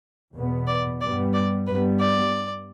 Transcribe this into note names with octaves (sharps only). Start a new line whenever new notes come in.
E2 B2 B3
D5
G2 G3 B3 D5
D5
G2 G3 B3 B4
D5